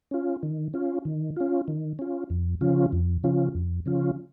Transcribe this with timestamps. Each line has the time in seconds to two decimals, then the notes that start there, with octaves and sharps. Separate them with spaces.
0.11 C#4 F4
0.43 D#3
0.74 C#4 F4
1.05 D#3
1.36 C#4 F4
1.68 D#3
1.99 C#4 F4
2.30 F2
2.61 C#3 F3 C#4 F4
2.93 F2
3.23 C#3 F3 C#4 F4
3.55 F2
3.86 C#3 F3 C#4 F4